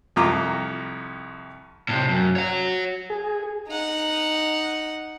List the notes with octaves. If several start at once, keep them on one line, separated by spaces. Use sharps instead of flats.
C2 F2 F4 A#5 D6
A2 C3
F#2
C#5 F#5
G#4
D#4 F#5